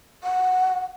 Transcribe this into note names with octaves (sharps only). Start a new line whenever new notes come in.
F#5